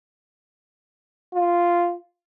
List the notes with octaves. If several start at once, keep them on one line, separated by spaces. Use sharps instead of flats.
F4